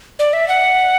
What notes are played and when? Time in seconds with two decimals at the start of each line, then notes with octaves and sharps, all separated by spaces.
0.19 D5
0.33 E5
0.48 F#5